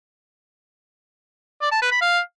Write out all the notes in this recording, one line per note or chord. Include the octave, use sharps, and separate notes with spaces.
D5
A5
B4
B5
F5